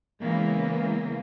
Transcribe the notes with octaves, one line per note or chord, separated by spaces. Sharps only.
C#3 E3 G#3 A#3 B3